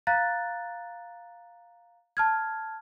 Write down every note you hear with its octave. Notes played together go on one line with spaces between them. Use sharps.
F5 A#5 F#6 A6
A5 F6 G#6